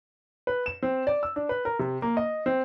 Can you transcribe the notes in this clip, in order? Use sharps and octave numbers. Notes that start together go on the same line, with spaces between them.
B4
E7
C4
D5
E6
D4
B4
A#4
C3
A#3
D#5
C4